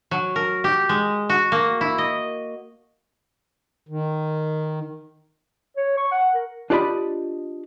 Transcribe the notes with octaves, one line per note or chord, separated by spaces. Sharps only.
F#3
A#4
G4
G#3
F#4
A#3
E4
D#5
D#3
C#5
C#6
F#5
A#4
D4 F4 G4 D5 D#5 B5